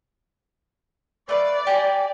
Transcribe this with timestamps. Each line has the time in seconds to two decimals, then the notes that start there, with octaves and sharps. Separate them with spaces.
1.29 A3 B4 D5 F5
1.67 G4 G#5 A#5